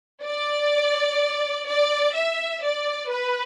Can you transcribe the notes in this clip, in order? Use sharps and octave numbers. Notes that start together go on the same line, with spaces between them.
D5
D5
E5
D5
B4